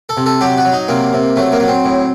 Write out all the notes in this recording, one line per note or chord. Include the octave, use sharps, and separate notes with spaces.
A4
C3
A4
F#3 G4
F#4
F#3
D#4
C3 A#3
C3
F#3 A3
A#3
F#3
C4
A2